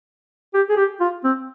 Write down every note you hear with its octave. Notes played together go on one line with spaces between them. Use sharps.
G4
G#4
G4
F4
C4